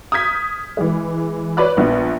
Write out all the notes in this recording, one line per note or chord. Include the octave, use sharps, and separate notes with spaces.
D#6 F6 G6 G#6 B6
E3 G#3
B4 C#5 D5 B5 F#6
A#1 B3